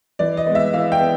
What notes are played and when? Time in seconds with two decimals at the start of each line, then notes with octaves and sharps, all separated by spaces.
0.19 E3 D5
0.37 D#5
0.46 G#3 B3
0.55 E5
0.73 E3 F5
0.92 G5
1.00 B3